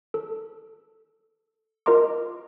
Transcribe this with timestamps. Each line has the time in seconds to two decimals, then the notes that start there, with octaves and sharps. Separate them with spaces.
0.14 A4
1.86 F4 A#4 D#5 A#5 C6 D6